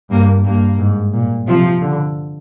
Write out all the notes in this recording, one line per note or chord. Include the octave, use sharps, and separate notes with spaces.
G2 A#3
G2 A#3
G#2
A#2
C3 F3
D3